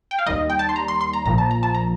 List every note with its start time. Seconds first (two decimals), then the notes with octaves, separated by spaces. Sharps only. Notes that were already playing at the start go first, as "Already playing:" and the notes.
0.11 G5
0.19 F5
0.26 D#2 D#3 G3 D#5
0.50 G5
0.59 A5
0.69 C6
0.76 A#5
0.88 C6
1.01 C6
1.13 A#5
1.25 A#1 A#2 F3 A#5
1.38 A5
1.51 A#5
1.63 A5
1.75 A#5